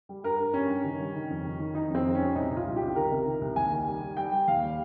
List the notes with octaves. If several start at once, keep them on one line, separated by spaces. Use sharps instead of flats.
G3
G2 A#4
G2
G3 C#4
G2
D#3
G3
D#3
F2
D#3
D#3
D#3 D#4
F2 C4
F2
C#4
G3
C2 D#4
C2
F4
C2
G4
C2
D#3 A#4
C3
D#3
C2
D#2 G#5
D#3
G3
G3
G3 G5
G3
D#2 F5
G3